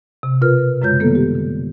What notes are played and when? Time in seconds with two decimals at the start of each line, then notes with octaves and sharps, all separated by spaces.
0.23 C3
0.42 B2 F4 A#4 B4 F6
0.82 F#2 C#3 G#3 F4 C#5 G6
1.00 D#3 G3 A#3 B3 A4
1.15 G4
1.35 D3